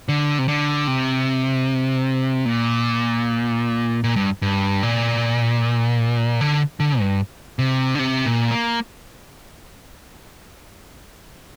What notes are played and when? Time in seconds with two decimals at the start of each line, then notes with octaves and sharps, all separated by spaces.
0.09 D3
0.39 C3
0.48 D3
0.87 C3
2.46 A#2
4.04 A#2
4.16 G2
4.42 G2
4.83 A#2
6.41 D3
6.80 D3
7.00 G2
7.59 C3
7.95 D3
7.99 C3
8.26 A#2
8.51 A#3